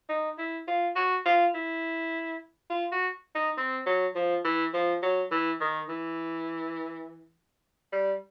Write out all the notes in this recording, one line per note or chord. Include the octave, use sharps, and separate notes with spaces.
D#4
E4
F4
F#4
F4
E4
F4
F#4
D#4
C4
F#3
F3
E3
F3
F#3
E3
D#3
E3
G3